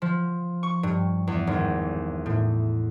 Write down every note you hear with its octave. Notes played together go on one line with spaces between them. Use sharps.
F3
C#6
G2
E2
G#1
A2